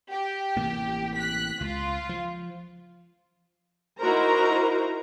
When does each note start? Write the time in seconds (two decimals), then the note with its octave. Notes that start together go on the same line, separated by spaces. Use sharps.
0.11 G4
0.56 A1 C3 A#3
1.15 F#6 B6
1.60 C#2 F4
2.09 F3
4.00 D#4 E4 F#4 A#4 C5 A#5